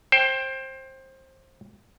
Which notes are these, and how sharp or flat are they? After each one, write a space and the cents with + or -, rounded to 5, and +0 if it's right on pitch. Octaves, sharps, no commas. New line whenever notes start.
C5 +20 G5 +0